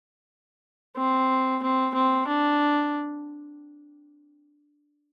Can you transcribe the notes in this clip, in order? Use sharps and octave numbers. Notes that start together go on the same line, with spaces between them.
C4
C4
C4
D4